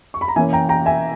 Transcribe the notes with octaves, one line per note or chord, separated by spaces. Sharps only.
C#6
B5
A#5
E3 A#3 C#4 E5 G#5
G5 A#5
G5 A#5
E5 G#5